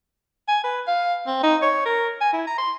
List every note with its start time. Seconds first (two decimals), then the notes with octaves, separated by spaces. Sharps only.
0.48 G#5
0.64 B4
0.87 F5
1.27 C4
1.43 D#4
1.62 C#5
1.85 A#4
2.21 G#5
2.33 E4
2.47 A#5
2.58 C6